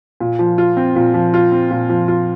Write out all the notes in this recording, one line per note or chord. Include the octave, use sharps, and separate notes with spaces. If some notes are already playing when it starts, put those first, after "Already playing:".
A#2
F3
F4
C4
A#2
F3
F4
C4
A#2
F3
F4